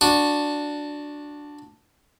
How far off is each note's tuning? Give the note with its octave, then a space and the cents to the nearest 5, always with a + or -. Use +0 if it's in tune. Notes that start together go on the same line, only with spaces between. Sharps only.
D4 +0 F#4 -15